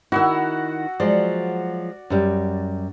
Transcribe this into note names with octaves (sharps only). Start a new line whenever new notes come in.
D#3 E4 F#4 F#5 E6
F3 F#3 G#3 D5
F#2 G3